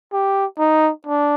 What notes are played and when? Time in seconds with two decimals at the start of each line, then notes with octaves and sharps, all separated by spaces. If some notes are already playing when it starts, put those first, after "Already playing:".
0.13 G4
0.59 D#4
1.06 D4